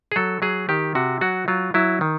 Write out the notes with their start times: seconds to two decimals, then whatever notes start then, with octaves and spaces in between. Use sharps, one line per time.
0.12 G#4
0.16 F#3 A4
0.42 F#3 G#4
0.69 D#3 G4
0.95 C3 F#4
1.21 F#3 F#4
1.48 F#3 F4
1.74 F#3 E4
2.01 D#3